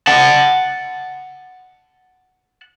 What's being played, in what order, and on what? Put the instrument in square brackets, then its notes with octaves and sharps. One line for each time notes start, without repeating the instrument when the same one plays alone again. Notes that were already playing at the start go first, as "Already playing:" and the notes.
[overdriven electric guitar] F#5 A5